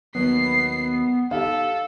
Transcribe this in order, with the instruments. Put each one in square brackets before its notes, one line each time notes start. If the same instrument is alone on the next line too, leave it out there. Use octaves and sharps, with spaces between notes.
[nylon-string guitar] D#2 F#3 [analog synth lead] B3 [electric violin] C7
[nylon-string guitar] D#4 G4 [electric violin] A4 [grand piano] F5